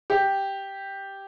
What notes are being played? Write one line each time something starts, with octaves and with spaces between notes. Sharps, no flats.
G4